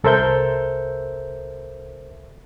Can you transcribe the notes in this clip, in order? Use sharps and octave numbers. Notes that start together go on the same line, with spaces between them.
C2 A4 A#4 C5 E5 G6